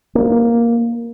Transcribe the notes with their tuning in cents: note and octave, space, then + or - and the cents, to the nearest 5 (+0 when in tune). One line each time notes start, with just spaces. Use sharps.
A#3 +5